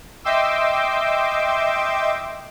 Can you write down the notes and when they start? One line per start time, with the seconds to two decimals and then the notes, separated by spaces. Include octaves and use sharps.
0.24 D#5 E5 G5 C6 D6 E6